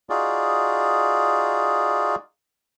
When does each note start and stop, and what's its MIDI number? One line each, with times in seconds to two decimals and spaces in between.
0.10 2.16 63
0.10 2.16 65
0.10 2.16 66
0.10 2.16 68
0.10 2.16 74